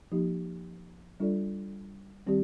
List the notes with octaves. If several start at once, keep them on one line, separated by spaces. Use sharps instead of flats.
F3 A#3 D#4 G4
G3 D4 F4 A4 D5
D#3 G3 C4 G4 D5